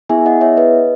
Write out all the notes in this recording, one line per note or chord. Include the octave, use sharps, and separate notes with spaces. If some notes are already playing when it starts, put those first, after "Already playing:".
B3 E4 G#4 E5 G#5
D#5 F#5
C#5 E5
B4 D#5